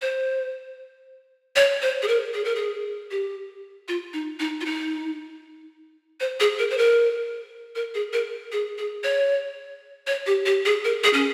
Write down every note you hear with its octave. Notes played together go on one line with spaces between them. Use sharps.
C5
C#5
C5
G#4
A#4
G#4
A#4
G#4
G4
F4
D#4
D#4
F4
D#4
C5
G#4
A#4
C5
A#4
A#4
G#4
A#4
G#4
G#4
C#5
C#5
G4
G4
G#4
A#4
G#4
C#4